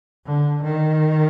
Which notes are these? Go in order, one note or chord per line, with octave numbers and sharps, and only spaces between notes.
D3
D#3